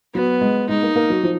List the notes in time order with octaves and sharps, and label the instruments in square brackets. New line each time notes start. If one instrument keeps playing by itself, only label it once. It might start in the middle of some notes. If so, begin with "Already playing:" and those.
[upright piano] F#3 [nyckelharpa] B3
[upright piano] G#3
[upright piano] G#3 [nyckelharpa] D#4
[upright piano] A#3
A#3
F#3
F3